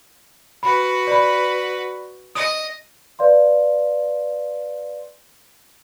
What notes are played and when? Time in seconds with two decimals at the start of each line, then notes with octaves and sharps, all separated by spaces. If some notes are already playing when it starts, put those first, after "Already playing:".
0.63 F#4 B4 B5
1.07 D5 B5
2.35 D#5 D#6
3.19 B4 D5 F5 C6